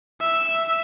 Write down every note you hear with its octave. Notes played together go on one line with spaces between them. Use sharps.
E5